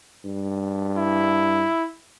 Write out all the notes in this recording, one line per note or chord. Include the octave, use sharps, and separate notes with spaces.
G2
E4